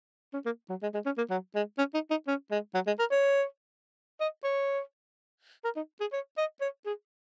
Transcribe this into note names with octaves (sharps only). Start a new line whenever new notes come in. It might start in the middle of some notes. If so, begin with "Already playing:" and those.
C#4
A#3
F#3
G#3
G#3
C#4
A#3
F#3
G#3
C#4
D#4
D#4
C#4
G#3
F#3
G#3
A#4
C#5
D#5
C#5
A#4
D#4
G#4
C#5
D#5
C#5
G#4